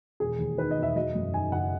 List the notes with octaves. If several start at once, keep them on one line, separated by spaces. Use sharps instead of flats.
E1 G#4
D#2
D#3 B4
D#5
E1
E5
F#3 D#5
F#2
D#3 G#5
F#1 F#5